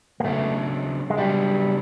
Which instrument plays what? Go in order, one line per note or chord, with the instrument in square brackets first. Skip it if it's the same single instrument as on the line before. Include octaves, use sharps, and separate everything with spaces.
[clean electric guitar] A#3
[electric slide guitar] C#3 F#3 B3 D4 [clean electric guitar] A3
[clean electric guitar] G#3
[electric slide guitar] C#3 F#3 B3 D4 [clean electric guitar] G3